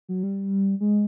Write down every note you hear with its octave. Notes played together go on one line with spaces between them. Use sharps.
F#3
G3
G#3